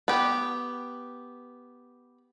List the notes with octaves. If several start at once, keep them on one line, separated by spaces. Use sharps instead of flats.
B3 G4 B4